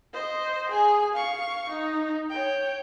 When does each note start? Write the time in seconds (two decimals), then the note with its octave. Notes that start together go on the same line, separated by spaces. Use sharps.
0.13 C5 D#5
0.70 G#4 G#5
1.14 F5 C#6
1.69 D#4
2.30 C#5 G5